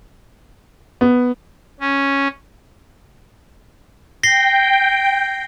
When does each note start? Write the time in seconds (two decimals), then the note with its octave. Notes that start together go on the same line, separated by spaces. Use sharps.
1.01 B3
1.80 C#4
4.23 G5 A#6 C7 G7